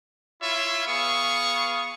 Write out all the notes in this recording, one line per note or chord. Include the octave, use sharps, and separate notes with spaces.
E4 F4 C#5 E5
B3 G#4 F5 C#6